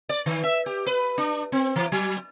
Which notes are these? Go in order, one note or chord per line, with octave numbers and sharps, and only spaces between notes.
D5
D#3
E5
G4
B4
D4
C4
E3
F#3